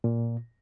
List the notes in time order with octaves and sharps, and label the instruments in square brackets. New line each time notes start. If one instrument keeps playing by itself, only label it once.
[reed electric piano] A#2